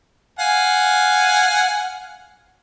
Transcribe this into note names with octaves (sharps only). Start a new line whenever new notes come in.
F5 F#5 G#5